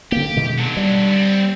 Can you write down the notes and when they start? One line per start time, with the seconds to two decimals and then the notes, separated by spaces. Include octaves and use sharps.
0.12 D3 A#3 G4
0.36 B2 D#3 G#3
0.58 D3 F#3
0.77 G3
1.11 B3 C4